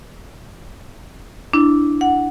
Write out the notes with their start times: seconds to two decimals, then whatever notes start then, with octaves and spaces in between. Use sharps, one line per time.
1.53 D4 E4
2.01 F#5